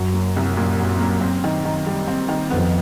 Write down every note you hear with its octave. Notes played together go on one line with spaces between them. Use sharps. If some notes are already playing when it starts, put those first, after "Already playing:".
Already playing: F#2 F#3
A#3
C2
A#2
F#3
A#3
C4
D#3
D#3
G3
C4
D#3
F2 B3